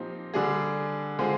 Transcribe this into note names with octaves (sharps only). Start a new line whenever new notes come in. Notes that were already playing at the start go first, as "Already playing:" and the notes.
Already playing: A#2 F3 C4 D#4 G4
D3 G3 D4 G#4
D3 G#3 C4 F4 G#4